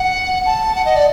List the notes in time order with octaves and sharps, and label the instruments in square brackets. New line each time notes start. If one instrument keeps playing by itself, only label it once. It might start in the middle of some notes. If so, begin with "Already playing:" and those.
Already playing: [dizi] F#5
A5
F#5
D#5
D5